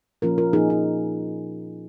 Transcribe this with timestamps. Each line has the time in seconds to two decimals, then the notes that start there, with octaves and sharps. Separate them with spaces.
0.22 A#2 F3 A#3 C#4 F4 A#4
0.38 F4 A#4
0.53 A#2 F3 A#3 C#4 D#4 G#4
0.70 D#4